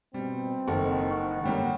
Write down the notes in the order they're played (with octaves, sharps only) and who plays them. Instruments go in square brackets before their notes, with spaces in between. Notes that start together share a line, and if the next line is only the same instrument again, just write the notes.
[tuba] B2 [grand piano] G3 [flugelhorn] C4
[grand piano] F#1 [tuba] D#3 [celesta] A4 F#5 A5
[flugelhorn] F#5 [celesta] C#6
[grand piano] G#2 G3 A#3 [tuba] D3 [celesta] C#5 G5